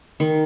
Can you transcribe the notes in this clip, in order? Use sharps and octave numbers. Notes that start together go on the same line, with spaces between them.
D#3